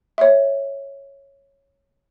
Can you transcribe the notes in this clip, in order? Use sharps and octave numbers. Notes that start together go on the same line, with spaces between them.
C#5 E5